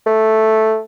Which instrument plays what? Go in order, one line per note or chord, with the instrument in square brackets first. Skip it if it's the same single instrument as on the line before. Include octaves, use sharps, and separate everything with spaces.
[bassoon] A3